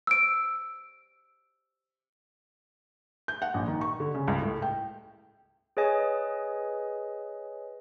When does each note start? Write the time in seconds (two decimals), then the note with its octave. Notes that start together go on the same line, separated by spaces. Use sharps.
0.07 E6 D7
3.28 G6
3.42 F#5
3.54 A#1
3.68 D#3
3.81 C#6
4.00 D3
4.15 C#3
4.28 C#2
4.42 A2
4.62 G5
5.77 G#4 B4 C#5 D#5 G#5